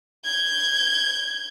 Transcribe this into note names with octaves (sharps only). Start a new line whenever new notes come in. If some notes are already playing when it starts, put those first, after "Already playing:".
G6 G#6